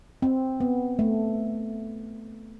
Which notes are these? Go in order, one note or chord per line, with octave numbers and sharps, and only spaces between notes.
C4
B3
A3